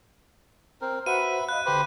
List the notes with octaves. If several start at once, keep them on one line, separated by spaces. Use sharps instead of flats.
C4 A#4
F#4 B4 C5 E5 F#5 D#7
D#5 F5 B5 F#6
G#1 D3 G4 B4 C5 B5